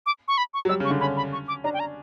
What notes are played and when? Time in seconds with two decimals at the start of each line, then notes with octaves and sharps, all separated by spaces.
0.06 D6
0.28 C#6
0.38 B5
0.54 C#6
0.65 F#3
0.69 G3 E6
0.80 C#3
0.85 C#6
0.90 D3
1.00 C#4 B5
1.17 B5
1.33 C#6
1.48 D6
1.64 D4 A#5
1.74 G5
1.80 A#5